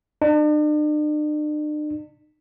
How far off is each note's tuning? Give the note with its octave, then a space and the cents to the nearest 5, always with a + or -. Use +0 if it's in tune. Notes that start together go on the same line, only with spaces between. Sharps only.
D4 +45